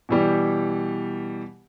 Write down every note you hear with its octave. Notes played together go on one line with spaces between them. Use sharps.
B2 E3 G3 G4